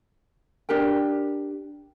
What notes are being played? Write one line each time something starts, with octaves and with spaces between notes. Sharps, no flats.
D4 G4 A#4 G5